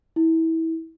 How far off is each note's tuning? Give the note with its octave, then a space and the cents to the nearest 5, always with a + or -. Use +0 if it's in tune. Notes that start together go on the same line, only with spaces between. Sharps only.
E4 -25